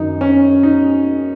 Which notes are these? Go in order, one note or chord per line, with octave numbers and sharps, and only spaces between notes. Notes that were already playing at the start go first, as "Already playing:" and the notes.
Already playing: F#2 D#3 D#4
C#4
D#4